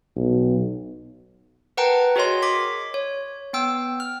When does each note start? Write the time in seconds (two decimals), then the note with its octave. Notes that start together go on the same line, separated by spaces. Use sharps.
0.16 B1
1.77 A#4 B4 F#5 G5 A5 A#5
2.16 F#4 G#4 A#4 C#5 D#5 C6
2.42 C#5 D6 B6
2.94 C#5
3.53 B3 G5 E6
4.00 F6